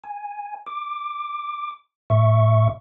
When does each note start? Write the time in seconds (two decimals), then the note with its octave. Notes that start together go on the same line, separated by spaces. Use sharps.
0.04 G#5
0.66 D6
2.10 A2 E5 C#6